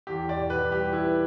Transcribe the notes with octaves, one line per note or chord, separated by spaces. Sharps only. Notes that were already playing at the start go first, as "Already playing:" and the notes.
E2 G4
E2
D5
B2
B4
E2
G3 G4
E2 E4
B4